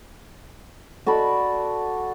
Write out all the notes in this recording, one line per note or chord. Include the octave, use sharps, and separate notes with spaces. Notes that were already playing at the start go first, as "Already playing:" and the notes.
F#4 A4 D5 B5